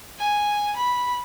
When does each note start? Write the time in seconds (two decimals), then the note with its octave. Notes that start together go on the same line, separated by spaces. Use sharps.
0.19 G#5
0.77 B5